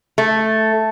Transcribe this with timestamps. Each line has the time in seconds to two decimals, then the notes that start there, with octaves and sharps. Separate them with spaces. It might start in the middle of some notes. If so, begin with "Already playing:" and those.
0.18 A3